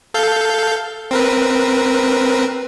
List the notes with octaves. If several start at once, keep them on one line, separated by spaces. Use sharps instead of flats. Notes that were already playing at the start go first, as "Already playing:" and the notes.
A4 F5 G6
C4 A#4 B4